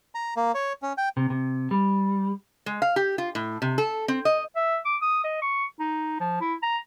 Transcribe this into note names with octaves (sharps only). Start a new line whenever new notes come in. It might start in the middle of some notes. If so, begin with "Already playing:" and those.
A#5
A#3
C#5
C#4
G5
C3
C3
G3
G#3
F5
G4
F4
A2
C3
A4
C4
D#5
E5
D6
D#6
D#5
C#6
D#4
F3
E4
A#5